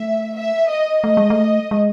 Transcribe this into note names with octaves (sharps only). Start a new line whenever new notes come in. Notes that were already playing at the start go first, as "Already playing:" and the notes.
Already playing: A3 E5
E5
D#5
A3 D#5
G#3
A3
G#3